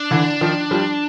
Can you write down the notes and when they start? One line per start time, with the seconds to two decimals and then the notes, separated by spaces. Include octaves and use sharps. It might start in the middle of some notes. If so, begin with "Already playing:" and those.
Already playing: D4
0.11 D3 E3
0.41 D#3 F3
0.71 F3 G3